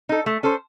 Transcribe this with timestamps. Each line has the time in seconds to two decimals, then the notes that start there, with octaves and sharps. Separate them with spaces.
0.09 D#4 A4
0.26 A3
0.43 C#4 A4 C5